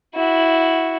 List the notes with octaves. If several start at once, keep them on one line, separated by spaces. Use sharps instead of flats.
E4 F#4